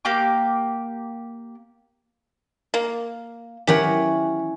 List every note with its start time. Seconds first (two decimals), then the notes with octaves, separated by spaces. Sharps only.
0.05 A#3 G4 G5 D6
2.74 A#3
3.67 E3 C#4 G4 A#4 F#5